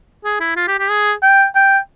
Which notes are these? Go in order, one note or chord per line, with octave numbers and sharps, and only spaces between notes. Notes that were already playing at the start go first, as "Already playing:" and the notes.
G#4
E4
F4
G4
G4
G#4
G5
G5